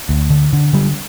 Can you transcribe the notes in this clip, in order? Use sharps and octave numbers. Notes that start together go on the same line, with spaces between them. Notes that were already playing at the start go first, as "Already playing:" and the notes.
D2
D3
D3
D3 G3